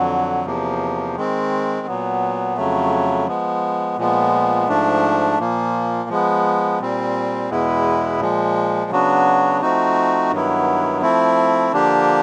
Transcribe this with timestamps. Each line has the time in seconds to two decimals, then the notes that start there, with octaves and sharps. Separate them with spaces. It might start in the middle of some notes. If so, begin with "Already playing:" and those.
Already playing: F2 D3 F#3
0.45 E2 C3 F3 A#3
1.16 D#3 G#3 C4
1.87 A#2 F#3 B3
2.56 F2 C#3 F#3 A3
3.27 F3 G#3 B3
3.98 A#2 F3 G#3 B3
4.68 G#2 F3 A3 D4
5.39 A#2 F3 A#3
6.09 F3 G#3 B3
6.80 A#2 G3 C4
7.50 E2 B2 G#3 B3 E4
8.20 A#2 F3 G#3
8.91 C#3 F#3 B3 D4 F#4
9.61 F3 A3 C4 D#4 F#4
10.31 G2 D#3 F#3 B3 E4
11.02 F3 A3 C4 E4
11.73 D3 F3 A#3 D4 G4